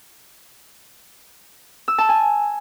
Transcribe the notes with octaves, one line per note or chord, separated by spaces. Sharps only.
E6
A5
G#5